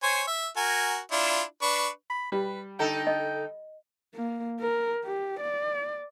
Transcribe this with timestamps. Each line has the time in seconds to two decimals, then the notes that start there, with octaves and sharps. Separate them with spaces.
0.03 C5 C#5 G#5
0.27 E5
0.57 F#4 A#4 G#5
1.12 D4 E4 F4
1.62 D4 B4 C#6
2.10 B5
2.32 G3 B4
2.79 D3 D#4 A4 G5
3.07 D#5
4.14 A#3
4.61 A#4
5.05 G4
5.40 D5